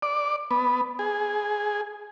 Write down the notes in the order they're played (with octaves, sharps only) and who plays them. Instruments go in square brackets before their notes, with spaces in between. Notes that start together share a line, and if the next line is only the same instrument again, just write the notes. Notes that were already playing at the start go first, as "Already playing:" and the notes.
[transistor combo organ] D5
B3
G#4